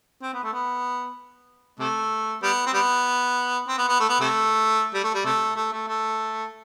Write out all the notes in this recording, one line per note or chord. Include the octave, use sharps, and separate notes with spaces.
C4
B3
A3
B3
C3 A3
G3 B3
C4
G3 B3
C4
B3
B3
A3
B3
C3 A3
G3
A3
G3
C3 A3
A3
A3
A3